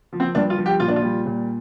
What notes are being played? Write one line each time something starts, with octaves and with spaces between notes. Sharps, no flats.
F3
C4
G2 D4
F4
F3
G4
A#2 F4
D4
F4
G3
A#2